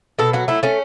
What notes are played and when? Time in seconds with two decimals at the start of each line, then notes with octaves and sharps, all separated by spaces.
0.19 B2 A4
0.33 F#3 F#4
0.48 A3 E4
0.63 A3 C#4